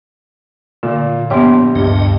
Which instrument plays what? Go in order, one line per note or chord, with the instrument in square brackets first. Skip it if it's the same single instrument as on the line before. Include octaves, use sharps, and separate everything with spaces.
[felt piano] A#2 [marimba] D3
[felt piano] A#1 G4 C6 [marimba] B3 C#5
[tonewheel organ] D2 C#3 D#5 [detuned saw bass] G2